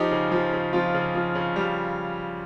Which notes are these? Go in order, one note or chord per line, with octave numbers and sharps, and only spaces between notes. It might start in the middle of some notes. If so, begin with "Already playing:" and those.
Already playing: F3 D#4 G4
C#3
F3
C#3
F3 F4
C#3
F3
C#3
G3